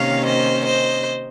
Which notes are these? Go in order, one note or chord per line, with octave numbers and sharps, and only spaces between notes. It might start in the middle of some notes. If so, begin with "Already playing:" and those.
Already playing: C3 D#3 A#3 C#4 C#5 F5
C5 D#5
C5 D#5